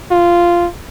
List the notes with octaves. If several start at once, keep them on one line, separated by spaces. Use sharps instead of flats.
F4